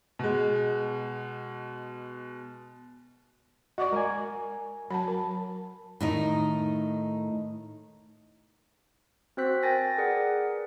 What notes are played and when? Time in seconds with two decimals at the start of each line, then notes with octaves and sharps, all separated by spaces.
0.19 B2 G#3
3.78 F#4 D5 D#5 C#6 D6
3.92 G#3 A#4 G#5
4.91 F#3 A5 B5
5.08 A#4
6.01 A2 D#3 D#4
9.37 C4 F#4 C5 E6 F#6 B6
9.63 A#4 G5 G#5 A6 A#6
9.98 G#4 A#4 B4 D5 F#5